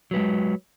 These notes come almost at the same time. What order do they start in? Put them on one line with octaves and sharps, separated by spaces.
F#3 B4 G#3